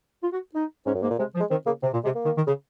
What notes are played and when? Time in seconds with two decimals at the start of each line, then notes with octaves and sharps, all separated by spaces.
0.22 F4
0.32 F#4
0.54 D#4
0.86 G#2 C#4
0.95 F#2
1.02 G#2 A#3
1.10 A#2
1.19 C3 G#3
1.35 F3
1.40 G#3
1.50 D#3 C4
1.66 C#3 A#3
1.82 C3 C4
1.93 A#2 A#3
2.04 C3 G#3
2.15 A#3
2.25 D#3
2.36 D#3
2.46 C#3